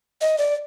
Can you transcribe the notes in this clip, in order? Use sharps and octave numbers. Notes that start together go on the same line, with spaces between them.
D#5
D5